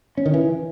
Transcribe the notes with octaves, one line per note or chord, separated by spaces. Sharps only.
C#4
D#3
E3